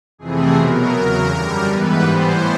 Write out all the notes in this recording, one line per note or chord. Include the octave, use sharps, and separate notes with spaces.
F2 C3 E3 A3 C4 G#4
B2 F#3 B3 A#4
E2 C#3 F#3 A#4
F#2 D3 G3
G#2 E3 G3 B3 B4
A2 E3 G3 B3 C5